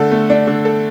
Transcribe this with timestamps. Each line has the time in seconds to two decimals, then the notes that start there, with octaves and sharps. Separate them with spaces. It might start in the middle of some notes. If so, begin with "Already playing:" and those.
Already playing: D3 A3 A4
0.11 A3
0.30 D4
0.47 D3
0.65 A4